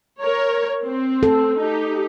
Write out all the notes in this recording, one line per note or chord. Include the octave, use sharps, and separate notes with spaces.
A#4 C#5
C4
A4
D#4 G4